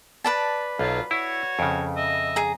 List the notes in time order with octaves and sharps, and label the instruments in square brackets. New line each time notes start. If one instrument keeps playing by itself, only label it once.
[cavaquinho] B4 D5 A5
[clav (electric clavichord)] B1 [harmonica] F#3 F4 A4
[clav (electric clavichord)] E4 [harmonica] F#4 C#5
[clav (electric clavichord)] F2 C#3
[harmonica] D#5 E5
[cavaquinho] G#4 A#5